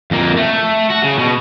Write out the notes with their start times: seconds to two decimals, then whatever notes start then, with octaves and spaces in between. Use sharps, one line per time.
0.11 F2 A#3
0.37 A3
0.91 F#4
1.04 C#3
1.19 B2